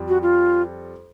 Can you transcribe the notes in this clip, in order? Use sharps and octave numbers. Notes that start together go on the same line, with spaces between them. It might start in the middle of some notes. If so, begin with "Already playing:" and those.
Already playing: F2 G3
F#4
F4